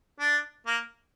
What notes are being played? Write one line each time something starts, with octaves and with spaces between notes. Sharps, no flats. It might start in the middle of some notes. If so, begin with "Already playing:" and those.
D4
A#3